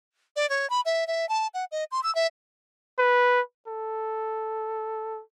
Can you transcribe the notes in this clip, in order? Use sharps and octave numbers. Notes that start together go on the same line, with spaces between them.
D5
C#5
B5
E5
E5
A5
F#5
D#5
C6
E6
E5
B4
A4